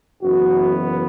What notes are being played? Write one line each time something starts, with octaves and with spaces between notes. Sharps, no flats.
F#1 F#2 E3 B3 F#4
F#4